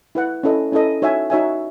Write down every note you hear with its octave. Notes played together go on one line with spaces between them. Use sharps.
E4 B4 F#5
C#4 E4 A4 D#5
C#4 E4 A4 D#5
D#4 F#4 C#5 E5 G#5
D#4 F#4 C#5 E5 G#5